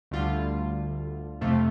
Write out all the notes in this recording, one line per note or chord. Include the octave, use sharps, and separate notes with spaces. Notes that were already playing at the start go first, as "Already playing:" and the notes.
D2 D3 G3 F4
F2 C3 A3 F4